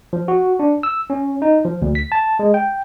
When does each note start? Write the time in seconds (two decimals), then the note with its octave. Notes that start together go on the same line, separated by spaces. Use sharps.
0.13 F3
0.28 F#4
0.59 D4
0.83 E6
1.10 C#4
1.42 D#4
1.65 F3
1.82 D2
1.95 B6
2.12 A5
2.39 G#3
2.54 G5